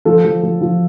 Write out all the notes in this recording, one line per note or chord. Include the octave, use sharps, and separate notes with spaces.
F3 A4
F3
F3
F3